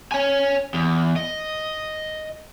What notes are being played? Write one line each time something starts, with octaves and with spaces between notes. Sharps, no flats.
C#5 G#5
E2
D#5